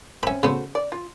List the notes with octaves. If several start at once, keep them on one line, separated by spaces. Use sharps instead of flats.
C4 C#4 E5 B5
C#3 A3 B3 F#4 C5
D5
F4